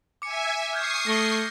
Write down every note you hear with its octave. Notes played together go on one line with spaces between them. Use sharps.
E5 G#5 D6 C#7
C#6 D#6 F6 G6 G#6 C7
A3 A#6 G7